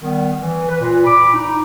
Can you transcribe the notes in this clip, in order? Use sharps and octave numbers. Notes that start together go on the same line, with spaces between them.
D#3 G3 B3
E3
B4
A#2
B5 D6
D#4